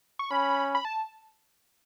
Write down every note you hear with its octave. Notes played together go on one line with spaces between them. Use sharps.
C#6
C#4 B5
B5
A5